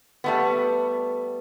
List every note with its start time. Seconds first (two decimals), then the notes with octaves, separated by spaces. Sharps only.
0.24 G3 A3 B3